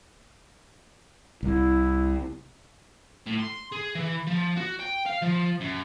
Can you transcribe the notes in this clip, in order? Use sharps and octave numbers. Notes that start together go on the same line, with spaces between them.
C2 E4
A2
C6
G#4
E3
F3
F#4
G5
F5
F3
F#2